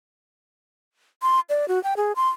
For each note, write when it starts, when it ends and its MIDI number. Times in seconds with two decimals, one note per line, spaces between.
1.22 1.40 84
1.49 1.68 74
1.68 1.82 66
1.84 1.94 79
1.97 2.12 68
2.16 2.29 84